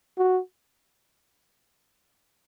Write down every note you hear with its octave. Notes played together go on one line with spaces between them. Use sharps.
F#4